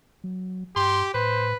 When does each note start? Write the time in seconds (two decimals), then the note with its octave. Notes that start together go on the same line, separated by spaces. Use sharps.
0.24 F#3
0.76 G2 G4 C6
1.14 A2 B4 C5